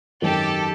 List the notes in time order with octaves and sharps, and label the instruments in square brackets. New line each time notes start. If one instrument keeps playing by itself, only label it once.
[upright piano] G#1 F#2 D#3 [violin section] G4 A4